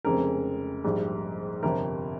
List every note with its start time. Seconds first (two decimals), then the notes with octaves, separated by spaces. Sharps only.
0.05 F1 F2 C#3 G#3 A#4
0.84 A#1 G#2 G3
1.63 G1 F2 C3 A#4